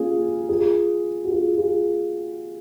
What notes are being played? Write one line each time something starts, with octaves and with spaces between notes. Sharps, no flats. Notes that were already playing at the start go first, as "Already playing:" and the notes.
Already playing: A#3 C#4 F4 G#4
F4 G#4
F#4
F4 G#4
F4 G#4